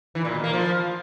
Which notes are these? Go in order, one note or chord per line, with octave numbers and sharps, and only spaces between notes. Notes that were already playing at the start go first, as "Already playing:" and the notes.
E3
A#2
B2
A#3
F3